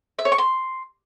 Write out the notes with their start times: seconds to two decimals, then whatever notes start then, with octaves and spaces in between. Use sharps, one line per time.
0.19 E5
0.25 C#5
0.32 C#6
0.38 C6